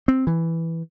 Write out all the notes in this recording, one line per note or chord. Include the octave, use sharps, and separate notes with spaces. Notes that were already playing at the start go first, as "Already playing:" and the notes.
C4
E3